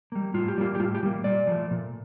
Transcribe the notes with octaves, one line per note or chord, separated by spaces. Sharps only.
G3 A#3
A2 F4
G4
G3 A#3 F4
G4
A2 F4
G4
G3 A#3
A#2 D5
F3 A3
A#2